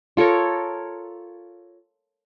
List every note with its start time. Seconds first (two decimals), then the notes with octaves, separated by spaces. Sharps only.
0.17 F4 A4 A#4 C#5